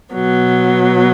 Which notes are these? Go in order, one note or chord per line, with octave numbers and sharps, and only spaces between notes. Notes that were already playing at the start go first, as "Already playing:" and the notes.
B2 F#3 B3